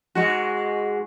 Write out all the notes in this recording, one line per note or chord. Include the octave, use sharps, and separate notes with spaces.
G#2 G#3 F#4